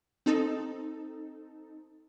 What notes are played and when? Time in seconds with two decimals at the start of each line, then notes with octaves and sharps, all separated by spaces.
0.26 C4 D#4 A4